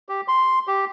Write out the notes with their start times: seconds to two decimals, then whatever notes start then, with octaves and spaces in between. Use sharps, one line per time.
0.09 G4
0.28 C6
0.67 G4